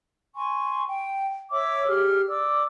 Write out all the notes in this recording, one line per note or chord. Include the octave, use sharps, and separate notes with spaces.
G#5 C6 C#6
G5
C#5 E5 D6 E6
G4 G#4 F6
D5 D6 E6